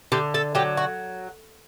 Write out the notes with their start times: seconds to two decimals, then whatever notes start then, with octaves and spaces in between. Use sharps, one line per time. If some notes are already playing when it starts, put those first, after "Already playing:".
0.12 D3 G4
0.34 A4
0.55 F#3 G4
0.77 F#4